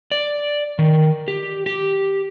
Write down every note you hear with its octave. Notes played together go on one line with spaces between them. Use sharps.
D5
D#3
G4
G4